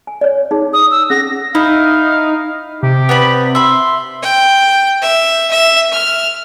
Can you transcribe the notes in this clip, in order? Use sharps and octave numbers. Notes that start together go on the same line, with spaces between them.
G#5
C#5 D5
D#4 G#4
D#6
E6
C#4 G#4 F#5 A#6
D#4 E4 F5
C3 G4
B3 D5 B5
E5 B5 C6
G5
E5
E5
F6